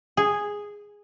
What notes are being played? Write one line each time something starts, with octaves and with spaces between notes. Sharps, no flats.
G#4